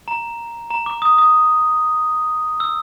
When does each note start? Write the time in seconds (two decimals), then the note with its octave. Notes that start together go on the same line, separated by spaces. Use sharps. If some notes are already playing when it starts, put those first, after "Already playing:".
0.08 A#5
0.70 A#5
0.86 D6
1.02 D#6
1.18 D#6
2.60 E6